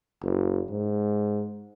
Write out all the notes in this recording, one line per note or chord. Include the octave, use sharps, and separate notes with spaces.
F#1
G#2